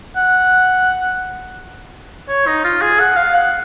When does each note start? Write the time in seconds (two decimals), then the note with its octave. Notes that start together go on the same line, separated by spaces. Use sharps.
0.16 F#5
2.28 C#5
2.47 D#4
2.64 F4
2.82 G#4
3.00 F#5
3.16 F5
3.35 F#5